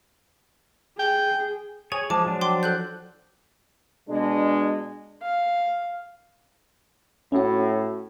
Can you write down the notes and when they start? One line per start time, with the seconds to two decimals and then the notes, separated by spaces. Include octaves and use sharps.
0.99 G#4 G5
1.92 G#4 C#5 G#5
2.10 F3 G#3 A5 D6
2.26 F3 F#3 D4
2.41 G5 C6 D6
2.63 A4 F#6 G6
4.09 B2 G#3 D4
5.22 F5
7.32 A2 C#4 F#4